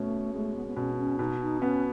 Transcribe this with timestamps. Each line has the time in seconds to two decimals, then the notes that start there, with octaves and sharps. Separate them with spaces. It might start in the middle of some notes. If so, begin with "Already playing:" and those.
Already playing: B2 A3 C#4
0.34 G#3 A3
0.56 B3
0.67 B3
0.76 B2 C#4
0.94 D#4
0.98 C#4
1.19 B2 D#4
1.41 D#4
1.61 B3 C#4